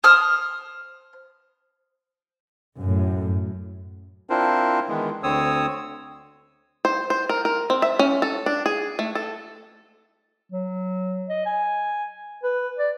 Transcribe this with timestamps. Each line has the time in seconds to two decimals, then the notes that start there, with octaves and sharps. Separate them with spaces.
0.04 C5 D#6 F6
2.78 F#2 A2
4.30 C4 D4 E4 F4 A#4 C5
4.89 D#3 E3 G#3 B3
5.23 D2 D3 C4 C#5 D#6 E6
6.85 C5
7.10 C5
7.29 A#4
7.45 A#4
7.70 C4
7.82 E5
7.99 C#4
8.22 A4
8.46 D4
8.66 G#4
8.99 A3
9.15 A4
10.52 F#3
11.29 D#5
11.46 G#5
12.43 B4
12.79 D5